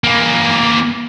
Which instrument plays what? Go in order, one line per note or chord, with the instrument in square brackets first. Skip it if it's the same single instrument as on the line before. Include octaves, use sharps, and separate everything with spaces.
[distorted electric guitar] E3 A#3